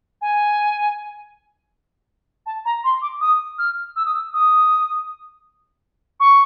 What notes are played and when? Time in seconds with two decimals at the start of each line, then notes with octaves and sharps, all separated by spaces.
0.21 G#5
2.46 A5
2.65 A#5
2.84 C6
3.01 D6
3.20 D#6
3.58 F6
3.96 E6
4.05 D#6
4.14 E6
4.33 D#6
6.20 C#6